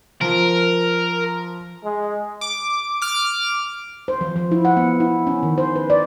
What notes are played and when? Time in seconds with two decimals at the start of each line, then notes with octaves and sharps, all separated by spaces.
0.21 F3 A#4
1.84 G#3
2.41 D6
3.02 D6 F6
4.08 C5
4.21 F3
4.36 F3
4.51 E4
4.65 F#5
4.77 B3
5.00 E4
5.27 C#4
5.43 D#3
5.58 C5
5.76 B4
5.90 D5